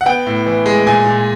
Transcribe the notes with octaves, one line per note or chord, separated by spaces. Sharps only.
F#5
B3 G5
A2
E3
G#3
A#2 G#5
A#2